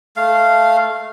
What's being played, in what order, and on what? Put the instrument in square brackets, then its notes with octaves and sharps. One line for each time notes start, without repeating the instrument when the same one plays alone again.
[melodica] A3 F5